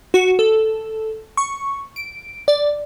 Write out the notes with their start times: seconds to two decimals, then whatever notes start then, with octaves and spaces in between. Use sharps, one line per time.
0.14 F#4
0.39 A4
1.37 C#6
1.96 D7
2.48 D5